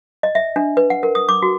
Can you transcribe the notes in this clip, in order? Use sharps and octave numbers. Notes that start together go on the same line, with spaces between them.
D#5
E5
D4
B4
F#5
A#4
D#6
D6
F#4